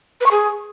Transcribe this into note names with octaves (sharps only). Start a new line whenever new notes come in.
B4
C#6
G#4